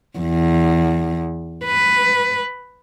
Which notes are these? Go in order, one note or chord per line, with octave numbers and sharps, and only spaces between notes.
E2
B4